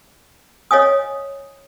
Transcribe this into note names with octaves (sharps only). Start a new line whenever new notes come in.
C#5 D#5 F5 G#5 D#6